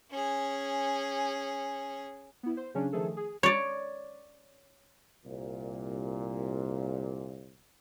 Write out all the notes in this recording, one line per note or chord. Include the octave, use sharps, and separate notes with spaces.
C#4 G#4
B3 E4
C5
C#3 F#3 C#4 D4
D#3 F3 A3 G#4 A4
G#4
C#5 D5
C2 A#2